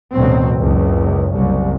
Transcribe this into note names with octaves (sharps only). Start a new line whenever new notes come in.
A1 D2 B2 F#3 C4
F#1 C#2
F#1 C2